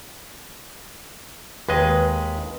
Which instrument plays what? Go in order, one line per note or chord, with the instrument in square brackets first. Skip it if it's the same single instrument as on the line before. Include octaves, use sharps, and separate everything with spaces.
[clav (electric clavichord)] D#2 G#3 D#5 [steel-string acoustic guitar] B4